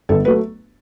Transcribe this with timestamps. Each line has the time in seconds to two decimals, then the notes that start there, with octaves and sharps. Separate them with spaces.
0.09 G1 A4
0.25 F#3 A3 B4